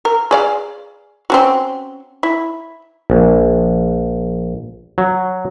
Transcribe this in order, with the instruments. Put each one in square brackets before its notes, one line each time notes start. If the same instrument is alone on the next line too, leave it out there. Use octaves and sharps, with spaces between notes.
[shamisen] A#4
G#4 D5 F5
C4 C#4 F#4
E4
[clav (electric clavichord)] A#1
F#3